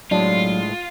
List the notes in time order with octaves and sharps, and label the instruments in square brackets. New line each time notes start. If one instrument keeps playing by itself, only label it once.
[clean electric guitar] A2 G#3 [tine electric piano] F#3 [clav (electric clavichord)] D4 [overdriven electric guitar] F4